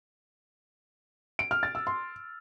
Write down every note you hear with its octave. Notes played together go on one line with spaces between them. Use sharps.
D7
F6
A6
E6
C6